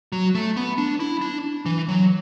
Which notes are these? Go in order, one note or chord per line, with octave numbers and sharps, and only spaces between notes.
F#3
A3
B3
D4
E4
D4
E3
F#3